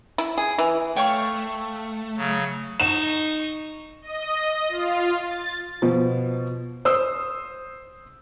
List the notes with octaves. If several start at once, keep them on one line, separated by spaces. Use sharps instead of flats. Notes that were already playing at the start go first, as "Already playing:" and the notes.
E4
G#4
E3
A3 C#5 F5 G5 C#6
C#3 F#3
D#4 C#6 E7
D#5
F4
A6
B2 F3
C5 D#6 E6